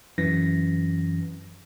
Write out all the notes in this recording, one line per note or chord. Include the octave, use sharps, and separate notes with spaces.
F#2 E3 A#6